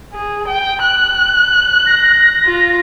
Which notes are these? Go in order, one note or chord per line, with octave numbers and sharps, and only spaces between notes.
G#4
G5
F#6
A#6
F4